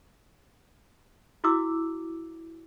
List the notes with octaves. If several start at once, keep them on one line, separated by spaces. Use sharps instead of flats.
E4 F#4 D6 E6